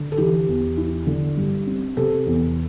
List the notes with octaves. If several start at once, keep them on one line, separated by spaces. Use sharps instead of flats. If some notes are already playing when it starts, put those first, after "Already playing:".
Already playing: D3
A4
E3 G4
E2
E4
D3
G2
C4
C3 A4
E2